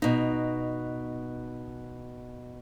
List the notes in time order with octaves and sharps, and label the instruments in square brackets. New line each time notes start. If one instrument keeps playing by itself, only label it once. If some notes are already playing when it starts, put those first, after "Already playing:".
[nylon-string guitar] B2 D#4